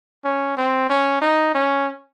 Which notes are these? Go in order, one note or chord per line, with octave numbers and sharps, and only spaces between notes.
C#4
C4
C#4
D#4
C#4